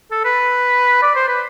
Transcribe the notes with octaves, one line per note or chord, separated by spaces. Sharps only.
A4
B4
D5
C5
B4